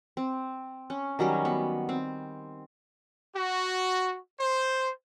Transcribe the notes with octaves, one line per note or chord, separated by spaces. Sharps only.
C4
C#4
D#3 F#3 G3 C#4
B3
C4
F#4
C5